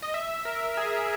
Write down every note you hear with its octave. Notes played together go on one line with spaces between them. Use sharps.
D#5
E5
A#4
G#4